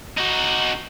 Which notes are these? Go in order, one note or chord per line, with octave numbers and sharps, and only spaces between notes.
D#4 F#4